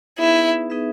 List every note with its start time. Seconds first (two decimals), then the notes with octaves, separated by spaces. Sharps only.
0.18 B3 D#4 E4 G#4 B4 E5
0.70 B3 D#4 G#4 B4 E5